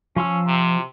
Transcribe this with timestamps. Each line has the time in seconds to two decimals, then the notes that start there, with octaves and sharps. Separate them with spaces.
0.16 F3 C#4 C6 E6
0.47 C3